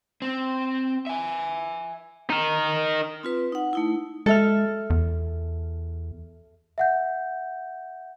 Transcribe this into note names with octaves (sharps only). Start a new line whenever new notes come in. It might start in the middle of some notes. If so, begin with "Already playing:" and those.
C4
E5 G#5
D#4 A#4
C4 F4 B4
D#4 F#5
A3 D#4 E4
G#3 A4 E5 F6
E2
E5 F#5 G6